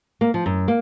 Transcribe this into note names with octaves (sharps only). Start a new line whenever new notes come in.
A#3
F3
F#2
A#3